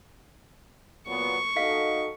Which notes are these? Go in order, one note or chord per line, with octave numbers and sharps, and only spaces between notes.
A#2 F#3 B3 C#6
D#4 F#4 A4 D#5 F5 B6